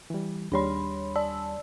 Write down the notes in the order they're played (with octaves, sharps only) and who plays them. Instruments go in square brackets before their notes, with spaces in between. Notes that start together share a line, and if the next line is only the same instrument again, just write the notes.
[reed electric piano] E3 G3
[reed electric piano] D#2 G3 C6 [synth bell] D4 C#5 B5
[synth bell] D5 A5 E6